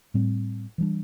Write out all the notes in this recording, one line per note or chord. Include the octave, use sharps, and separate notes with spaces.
A2 G3 C4
E3 G3 D4